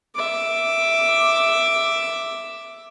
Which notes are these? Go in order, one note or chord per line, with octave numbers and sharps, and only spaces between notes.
E5 D6